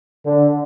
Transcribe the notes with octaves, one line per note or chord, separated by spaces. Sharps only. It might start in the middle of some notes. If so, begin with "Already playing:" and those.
D3